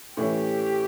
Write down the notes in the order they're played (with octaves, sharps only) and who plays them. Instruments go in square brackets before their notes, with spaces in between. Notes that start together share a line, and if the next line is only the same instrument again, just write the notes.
[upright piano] A2 E3 A3 C#4 [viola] G4